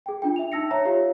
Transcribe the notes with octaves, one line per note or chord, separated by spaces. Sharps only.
G#4 G5
D4 F4 G5
E5 F7
D#4 A5 E6 A#6 C#7
C#5 E5 A#5
F4 G4 C#5 F5